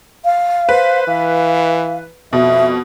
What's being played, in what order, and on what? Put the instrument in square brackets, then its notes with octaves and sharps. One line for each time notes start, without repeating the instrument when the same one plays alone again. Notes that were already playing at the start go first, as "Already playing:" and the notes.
[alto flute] F5
[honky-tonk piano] B4 [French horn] C5
[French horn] E3 [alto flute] F5
[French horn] F2 [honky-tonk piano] B2 [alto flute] E5